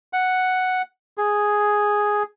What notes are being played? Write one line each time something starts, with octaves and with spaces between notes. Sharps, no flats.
F#5
G#4